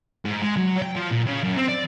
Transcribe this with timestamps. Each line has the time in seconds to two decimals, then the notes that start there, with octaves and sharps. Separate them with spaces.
0.25 G#2
0.42 G#3
0.57 F#3
0.82 G5
0.96 F3
1.11 A#2
1.26 C#3
1.43 F#2
1.57 C4
1.68 D5